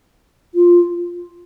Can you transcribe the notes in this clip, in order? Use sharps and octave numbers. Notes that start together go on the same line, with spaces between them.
F4